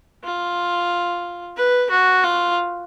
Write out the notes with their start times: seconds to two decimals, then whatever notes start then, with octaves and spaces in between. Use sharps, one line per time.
0.24 F4
1.57 B4
1.91 F#4
2.24 F4